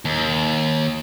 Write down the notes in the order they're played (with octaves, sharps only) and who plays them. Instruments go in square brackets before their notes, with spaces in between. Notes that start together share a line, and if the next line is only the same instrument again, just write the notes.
[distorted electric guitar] D#2